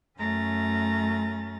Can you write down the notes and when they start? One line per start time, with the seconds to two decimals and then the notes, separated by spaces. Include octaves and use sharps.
0.18 F#2 A3 C#4 A#5 A6